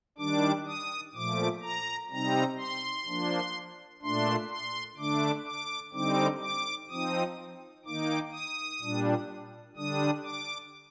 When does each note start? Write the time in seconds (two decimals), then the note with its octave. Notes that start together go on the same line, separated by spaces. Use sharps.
0.18 D#3 G3 D4 D6
0.67 D#6
1.15 A#2 F3 A3 D6
1.63 A#5
2.11 C3 G3 C4 D#4 A#5
2.58 C6
3.07 F3 A#3 D4
4.02 A#2 A3 D4 C6
4.50 C6
4.97 D3 A3 D4 D6
5.46 D6
5.93 D3 G3 C4 D#4 D6
6.42 D6
6.90 F3 C4 D#4 D#6
7.85 D#3 A#3 D#4 D6
8.33 D#6
8.81 A#2 G3 D4
9.77 D3 G3 D4 D#6
10.24 D6